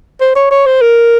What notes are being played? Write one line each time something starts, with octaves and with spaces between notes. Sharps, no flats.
C5
C#5
C#5
C5
A#4